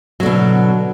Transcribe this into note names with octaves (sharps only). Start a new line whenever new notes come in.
B2 D3 F#3